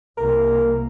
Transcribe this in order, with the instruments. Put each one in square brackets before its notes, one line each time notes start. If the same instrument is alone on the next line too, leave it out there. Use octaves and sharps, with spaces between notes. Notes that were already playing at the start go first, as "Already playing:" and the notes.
[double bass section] C2 A#3 [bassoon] A#4